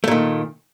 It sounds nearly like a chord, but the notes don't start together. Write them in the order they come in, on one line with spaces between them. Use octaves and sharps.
A3 A#2 D#3